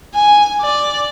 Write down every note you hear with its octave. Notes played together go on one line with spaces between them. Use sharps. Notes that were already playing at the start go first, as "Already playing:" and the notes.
G#5
D5